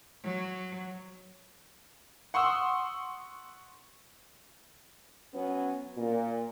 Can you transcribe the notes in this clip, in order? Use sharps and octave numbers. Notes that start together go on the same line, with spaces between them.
F#3
F#5 C6 C#6 D#6 E6
F#3 B3 C#4
A#2